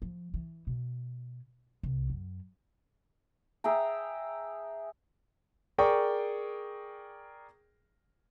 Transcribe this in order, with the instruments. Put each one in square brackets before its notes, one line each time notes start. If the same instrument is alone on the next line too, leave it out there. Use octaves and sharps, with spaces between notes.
[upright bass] F3
E3
B2
C2
F#2
[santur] G#4 E5 G5 A#5
[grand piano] G#4 A#4 D5 G5 C#6 D6